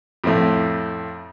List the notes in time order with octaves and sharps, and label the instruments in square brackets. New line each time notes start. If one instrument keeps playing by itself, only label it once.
[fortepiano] F2 A2 A3